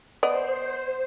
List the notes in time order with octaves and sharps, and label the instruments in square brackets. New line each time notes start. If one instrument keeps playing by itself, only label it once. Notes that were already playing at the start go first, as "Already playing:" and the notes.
[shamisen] B3 D5 D#5 [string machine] C5